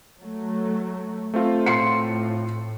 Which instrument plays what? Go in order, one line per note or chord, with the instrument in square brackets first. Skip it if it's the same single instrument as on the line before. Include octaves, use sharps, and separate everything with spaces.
[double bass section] F#3 A3
[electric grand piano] A3 C4 F4
[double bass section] A2 [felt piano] C6 C7 C#7